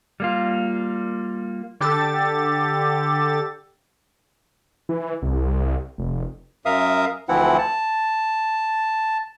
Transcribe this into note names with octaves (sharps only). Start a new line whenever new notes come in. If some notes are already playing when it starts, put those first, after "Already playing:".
G3 A#3 F4
D3 G4 A4 A6
E3
C2
F1
F#2 A#4 E5 F5 D#6
D2 E3 F3 C4 E4 F#5
A5